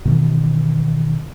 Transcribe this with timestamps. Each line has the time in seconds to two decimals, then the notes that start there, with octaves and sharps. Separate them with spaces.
0.05 B2 D#3 E3